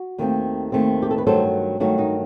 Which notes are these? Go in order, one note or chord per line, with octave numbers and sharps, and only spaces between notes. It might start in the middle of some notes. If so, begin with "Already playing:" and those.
Already playing: F#4
D#2 D#3 A3 C4
D#2 D#3 A3 C4
G4
A4
B4
G2 D#3 F#3 A3 A4 C5
G2 D#3 F#3 A3 D#4 F#4
D#4 F#4